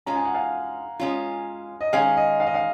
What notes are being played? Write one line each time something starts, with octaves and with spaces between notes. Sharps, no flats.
G#3 C#4 F4 A#5
G#5
F#5
F5 G#5
G#3 C#4 F4
D#5
D#3 G#3 C#4 G#4 F5
D#5
F5
D#5
F5